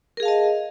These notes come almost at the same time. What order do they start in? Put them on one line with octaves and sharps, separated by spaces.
A#4 G#4 F5 A5 D#5